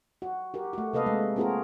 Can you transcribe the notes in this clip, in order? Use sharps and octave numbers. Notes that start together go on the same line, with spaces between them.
F#4
F#4 G4 A#4
A3 F#4
C3 A#3 A4 B4 D#5 F5
G#3 A3
A#3 C4 F4 F#4 G#4 A#4